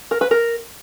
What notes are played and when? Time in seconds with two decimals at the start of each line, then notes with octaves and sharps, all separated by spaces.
0.11 A#4
0.21 B4
0.31 A#4